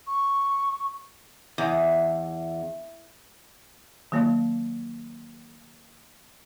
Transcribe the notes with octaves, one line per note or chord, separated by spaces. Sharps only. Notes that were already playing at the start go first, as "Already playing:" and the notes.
C#6
E2
D#3 F#3 A#3